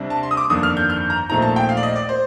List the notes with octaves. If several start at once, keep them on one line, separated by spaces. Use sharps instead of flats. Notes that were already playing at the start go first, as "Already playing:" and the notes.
Already playing: C2 C3 G3 D4
A5
C6
D#6
D6
G1 F2 D#3 A#3 D4 D#6
F6
G6
F6
A#5
A#1 A#2 A3 C4 D#4 A#5
A5
G5
F5
D5
D#5
D5
C5